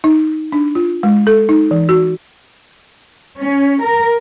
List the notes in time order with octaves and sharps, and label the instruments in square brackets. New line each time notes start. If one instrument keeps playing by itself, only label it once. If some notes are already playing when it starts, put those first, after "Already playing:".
[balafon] D#4
D4
F4
G#3
A4
D#4
E3
F#4
[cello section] C#4
A#4